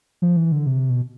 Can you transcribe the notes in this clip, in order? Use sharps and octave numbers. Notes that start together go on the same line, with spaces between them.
F3
E3
D3
C3
B2